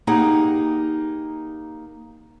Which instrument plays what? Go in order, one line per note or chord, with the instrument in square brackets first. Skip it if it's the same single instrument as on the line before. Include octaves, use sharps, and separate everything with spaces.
[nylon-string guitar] A#3 D#4 G4 G#4 F#5